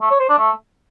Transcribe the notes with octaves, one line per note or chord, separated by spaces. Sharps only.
A3
C#5
C5
D4
A3